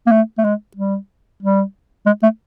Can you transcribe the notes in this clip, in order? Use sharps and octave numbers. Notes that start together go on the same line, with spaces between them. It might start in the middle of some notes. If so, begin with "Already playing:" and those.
A#3
A3
A3
G#3
G3
G3
G#3
A3